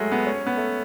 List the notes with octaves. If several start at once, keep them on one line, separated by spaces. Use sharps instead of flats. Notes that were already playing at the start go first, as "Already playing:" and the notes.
Already playing: F#3 G#3 A3
B3
C#4
B3
A3